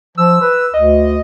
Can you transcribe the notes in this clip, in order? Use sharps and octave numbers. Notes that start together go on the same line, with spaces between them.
F3 E6
B4
D2 D#5